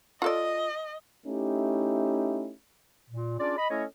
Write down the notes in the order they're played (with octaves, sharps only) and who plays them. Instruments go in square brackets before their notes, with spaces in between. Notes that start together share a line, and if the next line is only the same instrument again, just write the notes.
[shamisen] F4 A4 D5 [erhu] D#5
[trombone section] A3 C#4 D#4 E4 G4
[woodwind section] A#2
C#4 D4 F4 G#4 D5
D#5 B5
A3 C#4 E4 A4 C#5 D#5